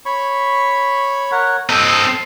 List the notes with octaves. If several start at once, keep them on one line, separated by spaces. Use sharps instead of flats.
C#5 B5 C#6
A#4 C#5 F#5
C4 A4 D#5